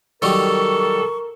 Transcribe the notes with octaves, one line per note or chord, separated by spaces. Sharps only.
D#3 F#3 G3 A4 A#4 C#6